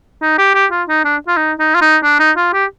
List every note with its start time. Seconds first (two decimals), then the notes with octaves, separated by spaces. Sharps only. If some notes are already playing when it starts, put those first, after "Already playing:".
0.22 D#4
0.38 G4
0.54 G4
0.71 F4
0.88 D#4
1.04 D4
1.28 F4
1.37 D#4
1.59 D#4
1.75 F4
1.81 D#4
2.03 D4
2.19 D#4
2.37 F4
2.53 G4